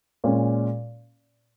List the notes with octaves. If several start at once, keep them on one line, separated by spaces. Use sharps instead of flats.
A#2 G#3 C#4